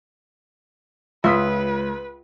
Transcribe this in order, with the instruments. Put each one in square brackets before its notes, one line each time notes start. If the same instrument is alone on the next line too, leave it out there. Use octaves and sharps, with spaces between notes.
[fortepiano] C#2 C6 D#6 [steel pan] F4 E5 [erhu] B4